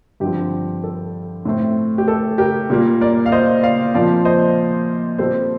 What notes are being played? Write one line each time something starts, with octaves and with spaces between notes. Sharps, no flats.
G2 D3 F3 C4 G4
A4
A2 A3 C4
G4
A4
G4 A#4
A#2 G3 A#3
A#4 D5
F5
C5 D#5
D5 F5
A#2 F3 C4 D5 F5
C5 D#5
A#2 G3 C4 A4 C5